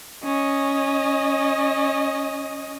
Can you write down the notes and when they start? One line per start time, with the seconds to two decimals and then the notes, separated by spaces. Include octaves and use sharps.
0.24 C#4 D#5